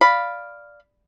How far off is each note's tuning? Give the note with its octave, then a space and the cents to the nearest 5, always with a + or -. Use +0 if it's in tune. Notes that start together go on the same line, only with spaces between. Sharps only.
D5 +0 F5 +0 B5 +0